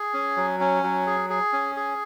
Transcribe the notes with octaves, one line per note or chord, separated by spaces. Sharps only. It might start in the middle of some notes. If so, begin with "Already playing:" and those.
Already playing: G#4
C#4
F#3
C#4
F#3
G#4
G#4
C#4
G#4